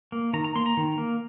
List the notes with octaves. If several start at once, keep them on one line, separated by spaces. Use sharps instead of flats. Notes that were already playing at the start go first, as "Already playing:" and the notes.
A#3
D#3 A#5
A#5
A#3 C6
A#5
D#3
A#3